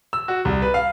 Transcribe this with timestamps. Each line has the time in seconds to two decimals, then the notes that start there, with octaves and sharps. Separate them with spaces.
0.13 E6
0.28 F#4
0.45 C2
0.62 B4
0.74 F5